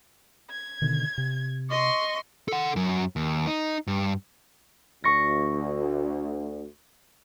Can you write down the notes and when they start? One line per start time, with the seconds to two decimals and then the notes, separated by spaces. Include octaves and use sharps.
0.50 G#6
0.82 B2 D3 D#3
1.18 C3
1.71 D#5 C6 C#6
2.48 A4 F#5
2.76 F#2 F#3
3.16 D#2
3.47 D#4
3.87 G2
5.04 D2 C#6 A#6